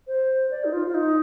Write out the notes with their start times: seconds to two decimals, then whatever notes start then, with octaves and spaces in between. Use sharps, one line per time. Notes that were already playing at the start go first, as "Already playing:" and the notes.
0.07 C5
0.51 D5
0.64 D#4
0.73 F4
0.87 F4
0.94 D#4